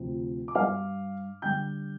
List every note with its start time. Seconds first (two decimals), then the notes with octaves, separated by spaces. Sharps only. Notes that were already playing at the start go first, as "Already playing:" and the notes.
Already playing: D2 C3 F3
0.48 D6
0.55 G2 G3 F5 F6
1.42 D3 G3 G5 G6